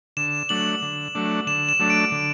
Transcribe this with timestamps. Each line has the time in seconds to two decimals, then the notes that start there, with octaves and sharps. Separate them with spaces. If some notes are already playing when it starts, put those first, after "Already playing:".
0.17 D3 E7
0.49 F#3 A3 D4 F#7
0.82 D3
1.15 F#3 A3 D4
1.47 D3 E7
1.69 E7
1.79 F#3 A3 D4
1.90 D7
2.12 D3